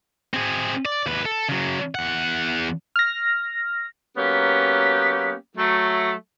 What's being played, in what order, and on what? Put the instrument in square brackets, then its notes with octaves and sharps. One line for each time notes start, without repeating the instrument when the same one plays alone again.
[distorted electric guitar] C4 G#4
D5
D#2 B4
A4
C#3 F#3
E2 F#5
[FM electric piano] F6 A#6
[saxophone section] F#3 A#3 B3 C#4 G4
F#3 A3